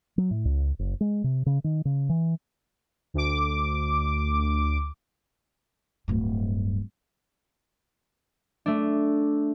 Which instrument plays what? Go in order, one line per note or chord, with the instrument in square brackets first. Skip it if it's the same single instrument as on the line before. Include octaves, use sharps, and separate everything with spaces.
[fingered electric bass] F#3
A2
C#2
F#1
G#3
C3
C#3
D#3
C#3
E3
[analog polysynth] D2 D6
[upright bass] D1 G2
[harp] A3 D4